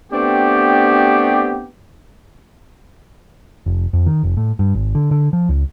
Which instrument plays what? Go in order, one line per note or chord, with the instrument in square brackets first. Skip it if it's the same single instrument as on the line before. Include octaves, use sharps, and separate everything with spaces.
[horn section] A3 B3 C4 D4 G4
[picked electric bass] F1
F2
D#3
F1
A2
G2
G#1
D3
D3
F3
C#2